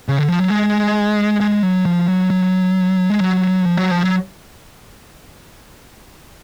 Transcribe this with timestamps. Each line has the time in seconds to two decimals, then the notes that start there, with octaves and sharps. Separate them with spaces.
0.09 C#3
0.19 D3
0.28 F3
0.39 F#3
0.50 G#3
1.40 G#3
1.63 F#3
1.85 F3
2.08 F#3
2.30 F#3
3.10 G#3
3.20 F#3
3.65 F3
3.77 F#3
3.91 F3
4.03 F#3